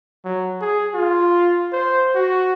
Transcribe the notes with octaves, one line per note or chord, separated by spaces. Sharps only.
F#3
G#4
F4
C5
F#4